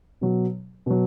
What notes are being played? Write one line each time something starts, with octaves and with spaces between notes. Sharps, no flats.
B2 F#3
B2 F#3